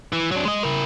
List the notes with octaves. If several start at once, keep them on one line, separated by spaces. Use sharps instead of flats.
E3
F#3 D4
G#3 D#5
E4 A#4